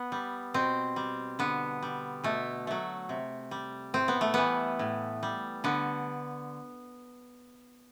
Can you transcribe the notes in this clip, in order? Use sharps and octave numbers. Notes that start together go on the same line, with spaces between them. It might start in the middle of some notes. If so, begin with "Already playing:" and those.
Already playing: B3
G3
B2 C4
G3
D3 B3
G3
B2 A3
F#3 A3
C3
G3
A2 C4
B3
A3
E3 G3 B3
A2
G3
D3 B3